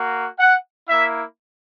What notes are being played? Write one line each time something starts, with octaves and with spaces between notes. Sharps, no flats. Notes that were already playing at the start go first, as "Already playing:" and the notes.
Already playing: A#3 F#4
F#5
A#3 E4 E5